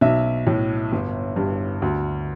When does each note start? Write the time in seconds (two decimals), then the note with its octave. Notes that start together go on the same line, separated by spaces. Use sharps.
0.01 B1 E5
0.47 A2
0.92 G1
1.36 G2
1.82 D2